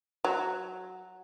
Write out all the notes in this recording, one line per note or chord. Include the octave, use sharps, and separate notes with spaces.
F#3